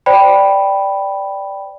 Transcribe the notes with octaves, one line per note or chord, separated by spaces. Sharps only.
C5 D5 G5 B5